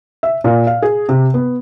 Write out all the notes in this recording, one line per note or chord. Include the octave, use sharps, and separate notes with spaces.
E5
A#2
F5
G#4
C3
B3